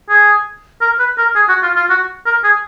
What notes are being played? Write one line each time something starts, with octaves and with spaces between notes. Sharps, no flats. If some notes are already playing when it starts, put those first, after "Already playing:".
G#4
A#4
B4
A#4
G#4
F#4
F4
F4
F#4
A#4
G#4